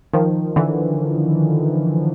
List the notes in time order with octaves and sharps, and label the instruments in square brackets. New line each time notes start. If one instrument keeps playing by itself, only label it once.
[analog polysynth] D#3 F3
D3 E3